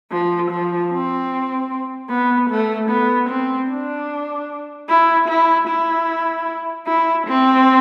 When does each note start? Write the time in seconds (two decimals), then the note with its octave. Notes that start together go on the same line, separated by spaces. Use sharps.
0.12 F3
0.51 F3
0.92 C4
2.10 B3
2.50 A3
2.90 B3
3.29 C4
3.70 D4
4.89 E4
5.29 E4
5.68 E4
6.87 E4
7.27 C4